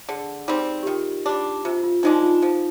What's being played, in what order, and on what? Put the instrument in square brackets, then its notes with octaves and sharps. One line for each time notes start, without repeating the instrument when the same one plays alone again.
[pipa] D3 [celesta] G#4
[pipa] G3 C4 [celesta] D#4
[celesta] G4
[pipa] D#3 [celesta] F4
[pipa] G3 D4 [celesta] G4
[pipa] C3 [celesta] F4
[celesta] F4
[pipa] F3 G#3 D4 [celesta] D#4
[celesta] F4
[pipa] F3